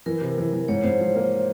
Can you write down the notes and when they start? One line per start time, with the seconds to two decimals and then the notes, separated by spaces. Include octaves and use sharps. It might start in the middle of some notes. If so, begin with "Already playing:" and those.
0.06 E3 A#4
0.21 C3
0.38 E3
0.53 E3
0.68 G#2 C#5
0.84 G#2 C5
1.00 F3 C5
1.15 A#3